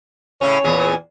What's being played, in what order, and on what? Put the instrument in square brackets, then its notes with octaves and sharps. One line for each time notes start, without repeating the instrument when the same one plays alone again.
[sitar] A2 C#3 C#4 [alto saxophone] C#5
[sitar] E2 A#2 G#4